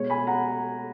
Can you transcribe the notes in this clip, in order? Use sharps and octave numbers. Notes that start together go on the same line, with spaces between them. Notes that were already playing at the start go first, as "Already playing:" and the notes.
Already playing: B2 G#3 C#5
G#5 B5
F#5 A#5